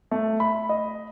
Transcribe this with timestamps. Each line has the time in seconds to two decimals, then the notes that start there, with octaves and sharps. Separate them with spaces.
0.11 A3
0.40 B5
0.69 D#5